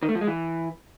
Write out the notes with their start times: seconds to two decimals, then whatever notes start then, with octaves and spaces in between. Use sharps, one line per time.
0.03 D#3
0.09 A3
0.15 F3
0.21 G#3
0.28 E3